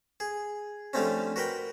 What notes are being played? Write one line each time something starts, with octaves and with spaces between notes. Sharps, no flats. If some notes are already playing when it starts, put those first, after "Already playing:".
G#4
D3 F3 G3 A3 C4 C#4
F#4 A#4 B4 G5